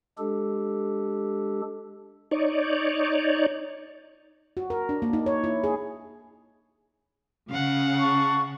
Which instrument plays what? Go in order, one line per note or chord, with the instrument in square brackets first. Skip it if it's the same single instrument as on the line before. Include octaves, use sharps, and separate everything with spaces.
[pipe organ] G#3 D4 G4 A4
[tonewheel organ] D#4 C#5 D5
[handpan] F#4
A#4
D4
A#3
D#4
C#5
E4
G#4
[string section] C#3 [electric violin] F5 F#5
[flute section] A5 C#6